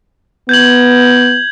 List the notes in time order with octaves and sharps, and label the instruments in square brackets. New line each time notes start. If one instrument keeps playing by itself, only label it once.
[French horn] B3 [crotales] G6 G#6 F#7